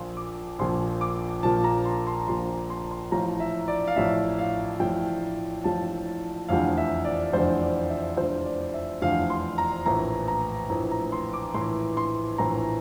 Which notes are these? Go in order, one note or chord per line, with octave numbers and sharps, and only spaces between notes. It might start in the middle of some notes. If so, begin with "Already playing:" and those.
Already playing: A#1 A#2 F3 C6
D6
A#1 A#2 F3 C6
D6
A#1 A#2 F3 A5
A#5
C6
C6
A#1 A#2 F3 C6
C6
C6
A1 A2 F3 A#5
E5
D5
F5
A1 A2 F3 E5
F5
A1 A2 F3 G5
A1 A2 F3 A5
F1 E2 D3 F3 F5
E5
D5
F1 E2 D3 F3 C5
D5
E5
F1 E2 D3 F3 C5
D5
E5
F1 E2 D3 F3 F5
C6
A#5
A#1 A2 E3 A#5
A#5
A#1 A2 E3 A#5
A#5
C6
D6
A#1 A2 E3 C6
C6
A#1 A2 E3 A#5